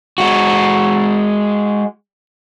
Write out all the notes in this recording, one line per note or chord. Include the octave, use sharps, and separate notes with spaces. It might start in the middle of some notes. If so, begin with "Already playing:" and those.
G#3 F#4